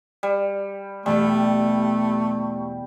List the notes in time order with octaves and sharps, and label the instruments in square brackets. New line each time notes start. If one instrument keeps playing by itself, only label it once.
[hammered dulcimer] G3
[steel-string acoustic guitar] E2 B2 G4 [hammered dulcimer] G3 [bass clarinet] A3